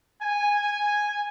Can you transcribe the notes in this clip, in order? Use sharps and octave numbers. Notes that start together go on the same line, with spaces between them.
G#5